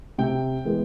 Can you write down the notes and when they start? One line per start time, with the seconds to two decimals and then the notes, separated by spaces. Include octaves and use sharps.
0.18 C3 G5
0.65 E3 G#3 B3